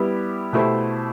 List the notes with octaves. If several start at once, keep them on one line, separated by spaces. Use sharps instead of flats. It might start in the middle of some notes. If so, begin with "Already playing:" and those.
Already playing: G3 B3 E4 G4 B4
B2 A3 E4 G4 C5